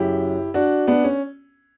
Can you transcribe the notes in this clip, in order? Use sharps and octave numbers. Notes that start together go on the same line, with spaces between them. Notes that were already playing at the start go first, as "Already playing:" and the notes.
Already playing: F#2 C#3 F#3 E4 G4
D4 F#4
B3 D4
C#4